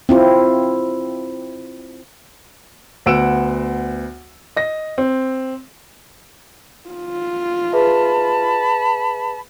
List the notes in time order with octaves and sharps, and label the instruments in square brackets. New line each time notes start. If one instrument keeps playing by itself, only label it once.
[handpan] C4 E4 F4
[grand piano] D2 B3 F#5 E6 D7 E7
D#5 A#6
C4
[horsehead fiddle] F4
[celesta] G#4 B4 E5 [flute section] A5 B5